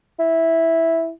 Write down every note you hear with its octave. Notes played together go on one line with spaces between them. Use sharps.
E4